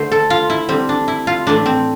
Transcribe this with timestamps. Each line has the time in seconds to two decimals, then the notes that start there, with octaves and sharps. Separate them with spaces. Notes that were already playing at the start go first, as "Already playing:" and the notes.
Already playing: D3 A3 C5
0.12 A4
0.30 F4
0.50 E4
0.69 D3 G3 C4
0.89 D4
1.08 E4
1.27 F4
1.47 A2 E3 A3 D4
1.66 C4